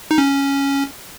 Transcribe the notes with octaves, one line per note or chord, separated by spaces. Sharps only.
D#4
C#4